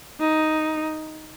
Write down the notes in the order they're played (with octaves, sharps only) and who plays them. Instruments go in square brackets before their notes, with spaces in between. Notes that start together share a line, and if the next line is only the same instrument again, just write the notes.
[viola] D#4